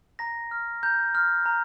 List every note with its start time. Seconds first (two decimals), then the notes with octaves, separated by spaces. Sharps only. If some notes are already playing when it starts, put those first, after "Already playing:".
0.19 A#5 A#6
0.51 F6
0.83 A#5 G6
1.15 F6
1.46 A#5